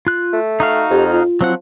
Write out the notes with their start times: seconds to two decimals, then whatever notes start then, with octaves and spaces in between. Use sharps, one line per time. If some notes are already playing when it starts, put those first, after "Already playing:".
0.07 F4 F#6
0.33 A3
0.60 D#4 F#4 F5
0.91 F2 G4
1.11 F4
1.41 F3 F#3 C4 F#5